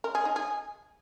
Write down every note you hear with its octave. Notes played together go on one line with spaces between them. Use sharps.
A#4
G#4
D#4
G#4